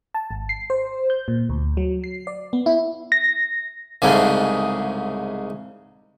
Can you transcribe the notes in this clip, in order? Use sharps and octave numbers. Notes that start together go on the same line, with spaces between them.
A5
G#1
C7
C5
G6
A#2
D2
F#3
C7
D5
B3
E4
A#6
C2 G#2 C#3 G#3 A3